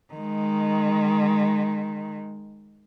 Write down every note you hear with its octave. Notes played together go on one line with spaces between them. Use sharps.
D#3 G#3